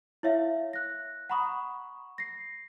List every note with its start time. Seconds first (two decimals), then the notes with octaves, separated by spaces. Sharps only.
0.23 E4 C#5 E5 F5
0.73 F#6 A#6
1.30 F#5 A#5 B5 C#6 D#6
2.18 A#6 C7